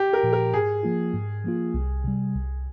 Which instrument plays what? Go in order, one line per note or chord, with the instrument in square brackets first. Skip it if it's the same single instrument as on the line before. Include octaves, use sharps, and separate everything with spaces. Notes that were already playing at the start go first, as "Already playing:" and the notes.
Already playing: [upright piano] G4
A#4
[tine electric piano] A#2 F3
[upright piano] A#4
[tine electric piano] G#2 [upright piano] G#4
[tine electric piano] F3 A#3 F4
G#2
F3 A#3 F4
C2
C3 G3
C2